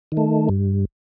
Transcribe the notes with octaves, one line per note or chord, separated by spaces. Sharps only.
D#3
A3
G2